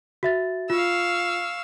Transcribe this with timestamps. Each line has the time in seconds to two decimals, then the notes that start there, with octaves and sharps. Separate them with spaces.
0.23 F#4 E5 A6
0.70 F4 F5 C#6 E6